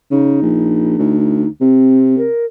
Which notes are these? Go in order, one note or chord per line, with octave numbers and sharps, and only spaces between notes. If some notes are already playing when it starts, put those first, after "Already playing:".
C#3 D#4
A#1
D2
C3 C4
A#4